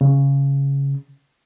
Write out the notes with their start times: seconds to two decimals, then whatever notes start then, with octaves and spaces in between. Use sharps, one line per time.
0.01 C#3